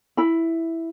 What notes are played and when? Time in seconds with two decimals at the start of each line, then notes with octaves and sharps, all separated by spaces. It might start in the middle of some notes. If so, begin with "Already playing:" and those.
0.17 E4 B5